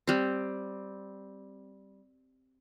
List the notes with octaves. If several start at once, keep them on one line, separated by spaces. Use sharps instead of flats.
G3 C4